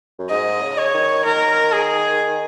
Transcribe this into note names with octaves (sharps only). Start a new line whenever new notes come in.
F#2
G#2 D#5
C#3
C#5
D#3
D#3 A#4
G#4